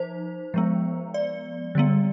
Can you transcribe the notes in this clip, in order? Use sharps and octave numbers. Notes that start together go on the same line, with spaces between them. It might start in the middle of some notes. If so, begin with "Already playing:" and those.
Already playing: F3 D#4 C5
F3 G#3 B3
D5
D3 G3 B3